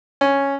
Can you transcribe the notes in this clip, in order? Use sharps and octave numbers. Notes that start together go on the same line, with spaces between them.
C#4